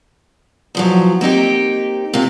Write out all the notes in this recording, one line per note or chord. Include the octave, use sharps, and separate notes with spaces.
E2 F3 F#3
A#3 C4 D#4 G4
C3 A#3 F4